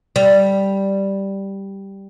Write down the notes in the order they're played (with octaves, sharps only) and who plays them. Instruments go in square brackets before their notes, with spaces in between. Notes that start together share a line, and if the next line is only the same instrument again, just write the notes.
[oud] G3